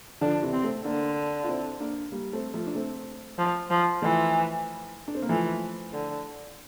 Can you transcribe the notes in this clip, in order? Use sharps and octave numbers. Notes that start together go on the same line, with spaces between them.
D3 F3 D4
C3 E3
C4
A3 C4
D3 A#3 D4
F4
C4 E4
A#3 D4
G3 A#3
A3 C4
F3 A3
D4
A3 C4
F3
F3
E3 F3 A3
D4
C4
A#3
E3 F3 A3
D3